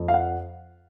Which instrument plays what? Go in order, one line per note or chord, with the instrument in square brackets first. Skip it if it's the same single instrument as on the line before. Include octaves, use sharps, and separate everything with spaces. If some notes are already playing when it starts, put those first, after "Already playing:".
Already playing: [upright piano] F2
F5
F#5